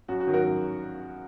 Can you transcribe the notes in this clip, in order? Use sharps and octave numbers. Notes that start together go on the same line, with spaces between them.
F#2 F#4
F#4
D#3 F#3
F#4 A#4
F#2